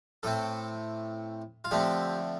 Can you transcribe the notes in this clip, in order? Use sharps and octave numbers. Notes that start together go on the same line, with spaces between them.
A2 A3 C4 A4
F4
D3 F3 A3 C4 G4